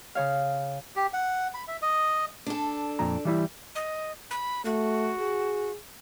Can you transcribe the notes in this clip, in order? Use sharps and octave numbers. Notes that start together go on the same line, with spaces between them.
C#3 C#5 F5
G4
F#5
B5
E5
D#5
D4 A4
F2 A#2 A#5
E3 G3 E4
D#5
B5
A3 F#4
G#4